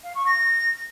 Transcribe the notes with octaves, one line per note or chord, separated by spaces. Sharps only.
F5
C#6
A#6